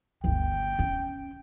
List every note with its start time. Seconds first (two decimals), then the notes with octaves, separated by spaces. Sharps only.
0.24 G1 D2 G5
0.79 C#4